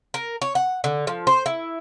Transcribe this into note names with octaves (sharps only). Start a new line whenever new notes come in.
A#4
C#5
F#5
D3
F3
C5
E4